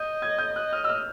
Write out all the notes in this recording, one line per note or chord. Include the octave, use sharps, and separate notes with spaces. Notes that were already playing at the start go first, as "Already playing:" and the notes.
Already playing: D#5 G6
G#6
G6
D#5 F#6
F6
E6
F6